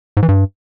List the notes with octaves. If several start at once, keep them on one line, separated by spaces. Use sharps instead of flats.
G#2
E3
G2